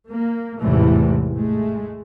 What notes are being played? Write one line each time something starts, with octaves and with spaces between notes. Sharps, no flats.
A#3
A1 E2 G#2 C3 E3 A3
G#3 A3